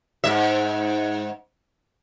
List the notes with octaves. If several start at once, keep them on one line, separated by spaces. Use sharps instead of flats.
G#2 E5